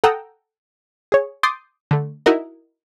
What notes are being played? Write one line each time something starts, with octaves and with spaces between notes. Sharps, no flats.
A4 F#5 G5 A#5 D#6 E6
G#4 C#5
C6 D6 D#6 G6 A6 C7
D3 A3
D#4 E4 F#4 A#4 D#5